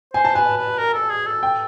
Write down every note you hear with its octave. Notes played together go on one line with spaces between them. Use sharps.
C5 G#5
A5
B4 G#5
B4
A#4
A4
G#4
A4
G5